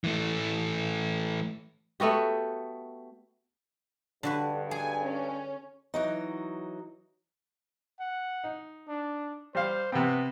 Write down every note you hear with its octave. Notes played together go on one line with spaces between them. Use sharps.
E3 A3
A3 B3 F#4 G4
B1 G2 D3 F#4 B4
G#4 G#5
C#4
E3 F#3 D#4
F#5
D#4
D4
G3 C5 F5
C3 B3 C4